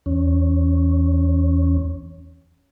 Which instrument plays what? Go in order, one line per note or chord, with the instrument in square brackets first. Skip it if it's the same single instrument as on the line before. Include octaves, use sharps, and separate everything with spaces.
[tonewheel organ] E2 C#4